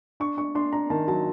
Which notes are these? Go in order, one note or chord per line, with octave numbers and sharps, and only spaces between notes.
D4 C#6
D4 C#6
D4 C6
D4 A#5
D#3 A5
F#3 A5